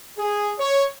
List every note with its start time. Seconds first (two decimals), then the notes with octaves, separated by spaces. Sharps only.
0.18 G#4
0.58 C#5